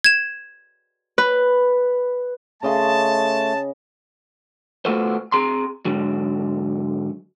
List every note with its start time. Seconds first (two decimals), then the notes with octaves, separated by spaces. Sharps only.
0.04 G#6 E7
1.18 B4
2.63 C#3 A3 D#5 A5 C6
4.85 A3 B3 F4 F#4 A4 C5
5.32 C4 G#4 A#5 C6
5.85 G#2 D3 F#3